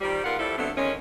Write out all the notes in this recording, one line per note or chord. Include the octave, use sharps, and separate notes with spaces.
D#3 F3 G3
G#2 B3 F4 A#4 F#5
A2 F3 G3 E4 A4
D3 F#3 A3 B3 C4
E2 D#3 G#3 C#4